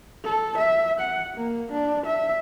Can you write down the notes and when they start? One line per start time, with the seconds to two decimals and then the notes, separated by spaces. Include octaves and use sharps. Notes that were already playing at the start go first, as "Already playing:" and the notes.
0.24 A4
0.58 E5
1.00 F#5
1.37 A#3
1.72 D4
2.06 E5